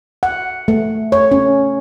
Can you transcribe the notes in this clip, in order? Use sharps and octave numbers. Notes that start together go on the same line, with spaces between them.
F#5
A3
C#5
C#4